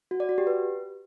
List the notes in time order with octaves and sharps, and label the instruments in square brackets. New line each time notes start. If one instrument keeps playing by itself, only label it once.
[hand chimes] F#4
D5
F#4
G4
B4